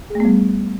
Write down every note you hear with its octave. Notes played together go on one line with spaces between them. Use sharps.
G3 A3 B3 G#4